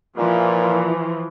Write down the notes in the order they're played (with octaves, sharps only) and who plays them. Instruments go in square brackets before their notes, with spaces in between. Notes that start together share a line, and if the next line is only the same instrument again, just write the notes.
[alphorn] A#2 [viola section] E3 F3